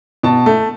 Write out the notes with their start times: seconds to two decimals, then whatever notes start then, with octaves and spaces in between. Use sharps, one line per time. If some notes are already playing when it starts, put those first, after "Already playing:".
0.23 B2 A5
0.46 A3